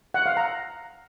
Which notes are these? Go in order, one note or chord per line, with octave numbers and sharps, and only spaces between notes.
F#5
F5
A#5